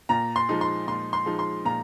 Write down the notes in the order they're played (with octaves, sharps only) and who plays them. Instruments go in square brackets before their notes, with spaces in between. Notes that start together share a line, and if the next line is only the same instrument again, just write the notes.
[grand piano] A#2 [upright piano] A#5
[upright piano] C6
[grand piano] F3 G#3 D#4
[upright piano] C6
[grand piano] A#2 [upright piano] C6
[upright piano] C6
[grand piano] F3 G#3 D#4
[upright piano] C6
[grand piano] A#2 [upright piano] A#5